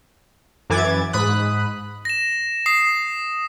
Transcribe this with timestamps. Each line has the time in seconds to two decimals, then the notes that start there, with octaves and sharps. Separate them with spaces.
0.70 F#2 E3 D6 G#6 A6
1.13 G#2 B5 D#6 F#6
2.05 A#6 E7
2.66 D#6 C7